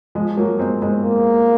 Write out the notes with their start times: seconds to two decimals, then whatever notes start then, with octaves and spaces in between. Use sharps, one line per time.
0.15 F3 G#3
0.37 F#3 A#3
0.59 G#3 C4
0.82 G#3 C4
1.04 A#3